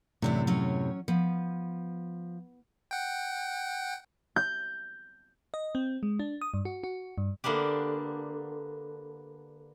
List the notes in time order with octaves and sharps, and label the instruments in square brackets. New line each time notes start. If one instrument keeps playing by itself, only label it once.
[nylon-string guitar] F#2 A2 C3 [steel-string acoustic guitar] E3 D4 E4
[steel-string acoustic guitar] F#3 C#4 C#5
[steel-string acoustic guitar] F3 [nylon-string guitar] B3
[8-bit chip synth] F#5 G5
[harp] G6
[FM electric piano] D#5
C4
G#3
D4
D#6
G2
F#4
F#4
G2
[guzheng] D3 A#3 B3 D4 G4